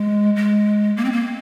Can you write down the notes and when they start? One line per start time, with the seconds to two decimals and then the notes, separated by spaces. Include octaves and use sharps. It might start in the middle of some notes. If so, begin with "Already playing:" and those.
Already playing: G#3
0.36 G#3
0.97 A#3
1.05 C4
1.12 A#3